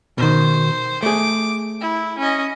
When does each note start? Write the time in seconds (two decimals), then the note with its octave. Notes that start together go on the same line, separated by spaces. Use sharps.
0.18 B2 D#3 C5
1.03 A3 G#4 D6
1.81 E4
2.18 C#4 D#5